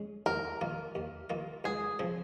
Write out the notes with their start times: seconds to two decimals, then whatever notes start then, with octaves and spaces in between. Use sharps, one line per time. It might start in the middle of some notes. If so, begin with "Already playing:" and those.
Already playing: G#3 C#4 G#4
0.26 D#2 A#4
0.61 D#3 A#3 F4
0.95 D#2
1.30 D#3 A#3 F4
1.64 C#2 G#4
1.99 C#3 F3 C4